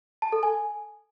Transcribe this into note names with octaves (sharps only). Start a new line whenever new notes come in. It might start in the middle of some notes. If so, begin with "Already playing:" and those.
A5
A4
G#5